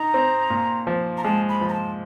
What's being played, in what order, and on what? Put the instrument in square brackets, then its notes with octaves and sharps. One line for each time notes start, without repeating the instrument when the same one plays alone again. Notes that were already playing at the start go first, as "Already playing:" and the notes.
Already playing: [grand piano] D#4 [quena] A#5
[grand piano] C4
A#2
F3
[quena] A#5
[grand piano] G#3 [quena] A5
[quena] B5
[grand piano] F3
[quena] A#5
A5